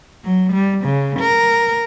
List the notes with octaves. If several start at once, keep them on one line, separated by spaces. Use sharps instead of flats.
F#3
G3
C#3
A#4